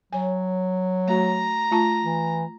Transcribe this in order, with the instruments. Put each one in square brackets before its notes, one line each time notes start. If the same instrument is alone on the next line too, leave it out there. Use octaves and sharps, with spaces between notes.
[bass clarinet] F#3 [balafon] C#5 G#5
[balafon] A3 F#4 [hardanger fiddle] A#5
[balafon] A3 F4 A5
[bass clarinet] E3